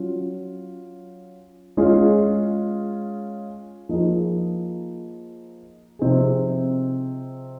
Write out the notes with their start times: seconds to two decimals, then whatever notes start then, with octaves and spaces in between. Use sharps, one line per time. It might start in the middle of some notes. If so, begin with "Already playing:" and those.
Already playing: F#3 C#4 F4
1.77 G#3 C#4 F4 G#4
3.89 F3 A#3 D#4 G#4
5.99 C3 F3 C4 D#4 G#4